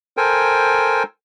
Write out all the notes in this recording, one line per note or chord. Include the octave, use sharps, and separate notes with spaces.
A4 A#4 C5 G5 G#5